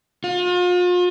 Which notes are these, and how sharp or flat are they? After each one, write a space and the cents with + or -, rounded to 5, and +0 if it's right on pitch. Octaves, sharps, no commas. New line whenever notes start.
F4 +40